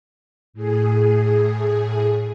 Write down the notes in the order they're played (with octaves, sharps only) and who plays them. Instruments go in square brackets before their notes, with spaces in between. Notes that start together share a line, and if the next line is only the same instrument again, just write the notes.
[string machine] A2 G#4